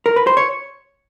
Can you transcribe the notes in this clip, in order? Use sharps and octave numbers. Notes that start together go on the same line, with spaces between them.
A#4
B4
C5
C#5